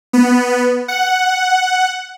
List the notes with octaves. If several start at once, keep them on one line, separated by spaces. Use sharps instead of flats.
B3
F#5